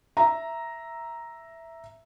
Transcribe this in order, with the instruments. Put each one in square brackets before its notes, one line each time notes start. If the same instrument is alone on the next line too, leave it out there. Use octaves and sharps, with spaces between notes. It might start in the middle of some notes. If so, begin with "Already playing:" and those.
[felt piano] E5 A#5